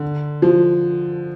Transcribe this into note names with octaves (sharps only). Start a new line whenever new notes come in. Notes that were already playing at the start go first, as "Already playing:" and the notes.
Already playing: D3
F3